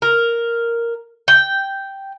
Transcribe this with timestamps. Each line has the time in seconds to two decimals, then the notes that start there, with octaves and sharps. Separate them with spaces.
0.02 A#4
1.28 G5